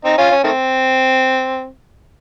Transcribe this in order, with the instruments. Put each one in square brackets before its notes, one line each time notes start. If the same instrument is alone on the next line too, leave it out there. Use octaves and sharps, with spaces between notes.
[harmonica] C4 D#4
C#4 F4
C#4
D#3 A3 C4